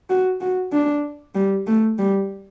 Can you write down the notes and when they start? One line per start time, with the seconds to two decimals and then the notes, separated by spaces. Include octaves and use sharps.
0.10 F#4
0.41 F#4
0.72 D4
1.35 G3
1.67 A3
1.99 G3